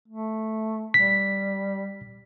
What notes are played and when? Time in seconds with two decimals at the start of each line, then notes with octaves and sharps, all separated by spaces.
0.08 A3
0.94 G3 B6